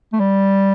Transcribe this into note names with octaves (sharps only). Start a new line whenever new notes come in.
A3
G3